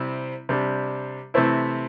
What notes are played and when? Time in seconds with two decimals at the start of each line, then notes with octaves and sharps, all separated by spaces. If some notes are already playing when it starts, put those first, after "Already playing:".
Already playing: C3 G3 C4 E4
0.49 C3 G3 D4
1.34 C3 E3 A3 C4 E4